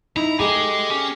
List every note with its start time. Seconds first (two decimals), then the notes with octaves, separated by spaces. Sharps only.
0.17 D#4 E4 A#5
0.39 A3 G4 G#4 D#5 G#5
0.90 C#4 G4